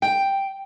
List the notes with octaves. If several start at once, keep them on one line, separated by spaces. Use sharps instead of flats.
G5